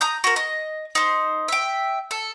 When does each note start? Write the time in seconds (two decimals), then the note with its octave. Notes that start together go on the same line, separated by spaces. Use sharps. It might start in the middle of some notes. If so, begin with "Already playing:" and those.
0.01 A#5 D#6 G6
0.24 F#4 A#4
0.36 D#5
0.95 D#4 C5
1.48 E5 G5
2.11 A4